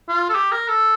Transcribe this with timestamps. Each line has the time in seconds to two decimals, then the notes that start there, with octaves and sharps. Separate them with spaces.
0.09 F4
0.29 A4
0.35 G4
0.52 A#4
0.68 A4